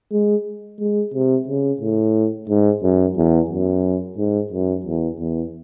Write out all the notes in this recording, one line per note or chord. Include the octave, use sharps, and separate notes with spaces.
G#3
G#3
C3
C#3
A2
G#2
F#2
E2
F#2
G#2
F#2
E2
E2